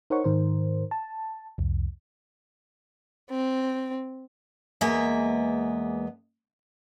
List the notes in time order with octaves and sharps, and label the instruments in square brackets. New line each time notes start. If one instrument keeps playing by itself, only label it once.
[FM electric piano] D#4 A#4 C5 C#5 F#5 C#6
G#2 D#3 A#4 C5
A5
C2 F2
[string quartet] C4
[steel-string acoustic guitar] E2 G#3 A#3 B3 E5